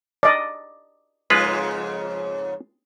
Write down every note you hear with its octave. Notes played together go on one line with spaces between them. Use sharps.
D5 D#5
F2 G#2 C#3 G#3 F4 B4